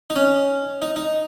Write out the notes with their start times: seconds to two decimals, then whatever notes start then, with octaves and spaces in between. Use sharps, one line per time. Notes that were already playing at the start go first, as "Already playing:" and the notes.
0.10 D#4
0.16 C#4
0.82 D#4
0.96 D#4